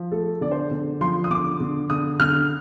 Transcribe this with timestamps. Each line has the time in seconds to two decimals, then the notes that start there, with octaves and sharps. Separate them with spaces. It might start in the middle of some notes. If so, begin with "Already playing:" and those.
Already playing: F3
0.12 A3 A4
0.41 D3 D5
0.51 C5
0.71 D3
1.01 F3 C6
1.24 D#6
1.30 D3 D6
1.60 D3
1.90 D3 D#6
2.20 D3 F6